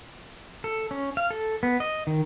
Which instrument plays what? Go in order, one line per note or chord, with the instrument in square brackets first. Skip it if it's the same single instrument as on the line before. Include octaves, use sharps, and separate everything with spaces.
[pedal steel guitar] A4
C#4
F5
A4
B3
D#5
D#3